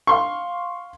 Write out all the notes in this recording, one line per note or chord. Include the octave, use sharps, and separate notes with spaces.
F5 C6 C#6